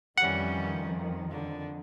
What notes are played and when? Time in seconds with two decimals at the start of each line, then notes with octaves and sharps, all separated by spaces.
0.18 F2 D#3 E3 G3 C#4 F#5
1.30 D3